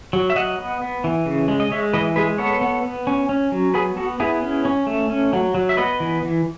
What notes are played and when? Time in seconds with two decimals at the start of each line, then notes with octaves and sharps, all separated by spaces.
0.13 F#3
0.30 E5
0.36 F#3 D#5 F#5
0.58 B3
0.82 B3
1.04 E3
1.26 C#3
1.48 G#3
1.60 D#5
1.71 G#3 C#5 E5
1.93 E3 B4 D#5
2.16 G#3 G#4 B4
2.38 B3 A4 C#5
2.61 B3
2.84 B3
3.07 C#4
3.29 C#4
3.52 F#3
3.74 B3 G#4 B4
3.97 B3 F#4 A4
4.20 B3 E4 G#4
4.42 C#4
4.65 C#4
4.87 A3
5.10 C#4
5.33 F#3
5.55 F#3
5.69 E5
5.77 B3 B4 D#5
6.00 E3
6.23 E3